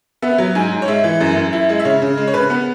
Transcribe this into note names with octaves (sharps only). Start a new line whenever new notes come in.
B3 E5
F#3
G#2 G#5
G#2
C#5
G#3 E5
E3
F#2
F#2
E4
G#3
E5
C#3 C#5
C#3
G#3
C#5
C#3 B4
B3